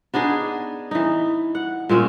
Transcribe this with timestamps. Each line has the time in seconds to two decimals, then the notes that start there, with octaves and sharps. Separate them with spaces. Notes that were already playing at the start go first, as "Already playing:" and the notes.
0.14 B3 D4 D#4 G#4
0.91 E3 D#4
1.55 F#5
1.89 A#2 G#3 C4 C#4